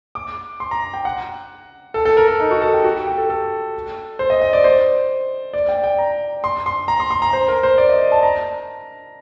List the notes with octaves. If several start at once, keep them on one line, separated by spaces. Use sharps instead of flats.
D6
C6
A#5
G5
F#5
A4
A4
A#4
A4
D#4
F#4
A4
G4
F#4
G4
G4
A4
A4
C5
D#5
D#5
D5
C5
D5
G5
G5
A#5
C6
C6
A#5
C6
C6
A#5
C5
A#4
C5
D5
D#5
A5
A#5